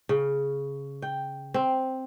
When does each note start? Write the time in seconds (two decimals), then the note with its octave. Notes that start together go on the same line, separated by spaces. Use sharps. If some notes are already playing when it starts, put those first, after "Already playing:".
0.09 C#3
1.02 G5
1.54 C4